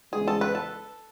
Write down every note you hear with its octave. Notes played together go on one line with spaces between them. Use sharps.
E2 C#3 G#3 G#4
A4
B4
A4